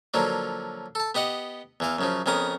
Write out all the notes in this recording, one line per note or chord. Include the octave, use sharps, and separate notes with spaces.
D3 F3 F#3 A#3
A4 A5
B3 G4 D#5 F#5
E2 E3 F5
F#2 C#3 F3
F2 C#3 B3 A#4 D#6